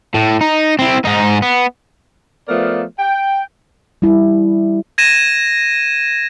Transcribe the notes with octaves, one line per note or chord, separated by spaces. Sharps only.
A2
D#4
C4 E4
G#2 D#4
B3
F3 A3 B3 A#4 D5 F5
G5
G3 E4
G#6 A#6 D#7 E7